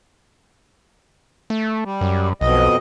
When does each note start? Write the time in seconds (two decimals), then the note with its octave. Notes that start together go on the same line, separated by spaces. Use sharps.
1.50 A3
1.85 G3
2.01 F#2
2.41 B1 F2 B2 D#5